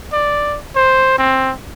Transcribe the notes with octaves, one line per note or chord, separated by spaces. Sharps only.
D5
C5
C4